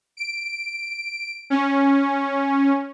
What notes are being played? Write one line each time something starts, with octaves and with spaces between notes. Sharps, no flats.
D7
C#4